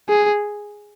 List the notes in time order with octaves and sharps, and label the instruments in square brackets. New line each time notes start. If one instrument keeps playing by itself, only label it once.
[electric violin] G#4